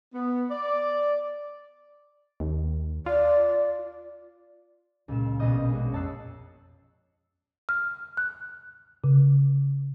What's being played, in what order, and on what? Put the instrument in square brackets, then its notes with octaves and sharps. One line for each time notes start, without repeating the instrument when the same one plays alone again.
[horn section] B3
D5
[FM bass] D#2
[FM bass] F4 [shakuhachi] D5
[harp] C#2 A#2 E7
A#1 B2 B3 D#5 D#6 G6
G#3 C#4 F#4
F2 C#5 A5 E6 F#6 C7
[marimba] F6
F#6
C#3